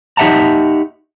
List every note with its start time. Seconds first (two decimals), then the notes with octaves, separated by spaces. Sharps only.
0.17 D#4 G4 E5 F#5 A5 A#5